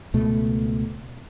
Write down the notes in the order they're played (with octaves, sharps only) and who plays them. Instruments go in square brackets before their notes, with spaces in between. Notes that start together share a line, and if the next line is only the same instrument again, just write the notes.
[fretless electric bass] C#2 B2 A3